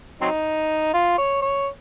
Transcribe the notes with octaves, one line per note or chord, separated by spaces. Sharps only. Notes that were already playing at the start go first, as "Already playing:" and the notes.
F#3 C4 D#4
F4
C#5
C#5